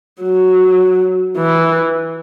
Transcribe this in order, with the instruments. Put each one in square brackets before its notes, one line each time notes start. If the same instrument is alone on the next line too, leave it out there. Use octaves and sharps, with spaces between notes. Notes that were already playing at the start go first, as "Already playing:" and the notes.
[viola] F#3
E3